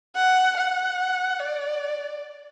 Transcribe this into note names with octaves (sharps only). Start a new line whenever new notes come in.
F#5
F#5
D5